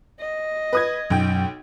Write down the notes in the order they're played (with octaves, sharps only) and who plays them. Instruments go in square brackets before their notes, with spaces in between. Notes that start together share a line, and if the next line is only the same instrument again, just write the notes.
[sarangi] D#5
[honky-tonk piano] B4 D#6 G#6
[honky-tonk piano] B1 G5 [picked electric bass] F#2